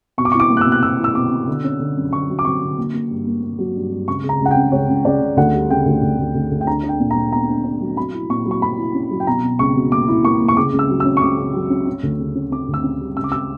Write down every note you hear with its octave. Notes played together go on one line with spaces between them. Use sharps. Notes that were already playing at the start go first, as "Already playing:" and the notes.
B2 C#6
D6
C#6
E4
D6
A#3
F#6
E6
B2
F#6
B2 E6
E4 E6
B2 D6
B2
D3
C#4
D3
F#2
D3 C#6
F#3
D6
F#3 C#6
D3
A#3
A#3
G2
A#3
A#3
F#3
G2
G2
C#2 C#6
C#3
A#5
C#2
F#5
G5
C#3
C#2 C#5
C#2
C#2 D5
C#2
D2 F#5
G3
C#3 G5
D2
D2
D2
D2
D2
G5
D4 A#5
D4
G5
A#2
A#5
A#2
B3 A#5
D4
D4
F#3
F#3 B5
E4
A#2 C#6
F#3
C#6
F#3 B5
E4
C#4
F#3
G5
B2 A#5
B2
C#2 C#6
B2
A#3 D6
E4
A#3 C#6
A#3
C#6
C#3 D6
C#2
E6
F#3
E6
C#4
C#6
C#2 D6
C#3
F#3
C#4
C#4
D2
C#3
C#4
C#4 D6
D2
E6
C#4
G3
C#2 E6
D6
E6